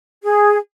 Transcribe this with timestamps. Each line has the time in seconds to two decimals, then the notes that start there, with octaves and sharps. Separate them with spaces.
0.23 G#4